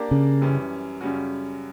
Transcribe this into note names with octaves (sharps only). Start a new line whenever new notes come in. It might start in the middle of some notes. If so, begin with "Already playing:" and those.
Already playing: A#3 D4 G4 A#4 D5
C#3
F#2 E3 G3 C#4
F#2 C#3 G3 C#4 F#4